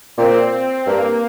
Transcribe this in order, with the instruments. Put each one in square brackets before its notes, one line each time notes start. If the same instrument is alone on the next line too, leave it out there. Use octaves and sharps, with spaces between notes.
[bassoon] A#2 [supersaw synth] C4
[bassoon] G2 [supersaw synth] A#3